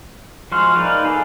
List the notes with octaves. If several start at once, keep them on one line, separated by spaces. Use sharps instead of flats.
F3 G#3 F#4 C6 F6
D#4 A#4 B4 D5 F5
F4 G#4 A4 D5